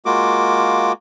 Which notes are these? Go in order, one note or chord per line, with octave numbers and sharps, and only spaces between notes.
G#3 A#3 F4 F#4 D6